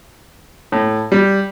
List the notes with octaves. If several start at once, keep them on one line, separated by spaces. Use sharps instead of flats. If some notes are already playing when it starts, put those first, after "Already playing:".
A2
G3